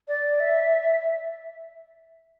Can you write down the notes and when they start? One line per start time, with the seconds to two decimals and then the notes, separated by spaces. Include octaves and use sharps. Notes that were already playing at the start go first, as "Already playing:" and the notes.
0.08 D5
0.40 E5